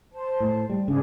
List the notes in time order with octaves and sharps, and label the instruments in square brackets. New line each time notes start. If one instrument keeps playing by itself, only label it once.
[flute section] C5 A5
[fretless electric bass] A2
G3
[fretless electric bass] G#2 C#3 [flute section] D4 G#4